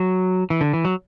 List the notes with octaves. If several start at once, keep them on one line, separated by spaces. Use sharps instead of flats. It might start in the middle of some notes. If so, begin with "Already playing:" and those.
Already playing: F#3
E3
D3
E3
F#3